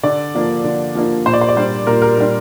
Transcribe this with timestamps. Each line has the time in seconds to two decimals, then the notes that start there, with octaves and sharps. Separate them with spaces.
0.03 D3 D5
0.35 F3 A#3 D4
0.64 D3
0.95 F3 A#3 D4
1.26 A#2 C5
1.33 D5
1.41 C5
1.49 D5
1.56 G3 D4 C5
1.87 A#2 A#4
2.02 A#4
2.18 G3 D4